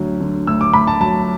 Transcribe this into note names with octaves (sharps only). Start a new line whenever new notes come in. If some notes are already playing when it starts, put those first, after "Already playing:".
Already playing: D2 D3 F#3
D3
D2 E6
D6
D2 B5
A5
F#3 A5